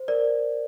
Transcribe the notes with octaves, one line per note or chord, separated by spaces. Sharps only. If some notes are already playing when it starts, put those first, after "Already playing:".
Already playing: C5
A#4 D5